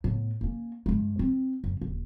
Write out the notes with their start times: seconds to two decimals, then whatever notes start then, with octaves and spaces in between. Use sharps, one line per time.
0.04 A2 B3
0.41 A#3 C#4
0.86 G2 G#3
1.19 C4
1.64 F#2
1.81 D#1